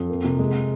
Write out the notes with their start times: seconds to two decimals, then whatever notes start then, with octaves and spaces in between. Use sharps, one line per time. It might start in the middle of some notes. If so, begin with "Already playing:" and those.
Already playing: F2
0.09 A#3
0.24 C3
0.39 G#3